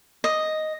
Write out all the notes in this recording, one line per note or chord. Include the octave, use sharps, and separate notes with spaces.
D#5